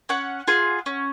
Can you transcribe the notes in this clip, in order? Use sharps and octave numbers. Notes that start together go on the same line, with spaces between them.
C#4 F#5
F4 G#4
C#4